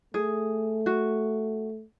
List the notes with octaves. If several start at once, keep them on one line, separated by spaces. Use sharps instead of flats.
A3 G#4
F#4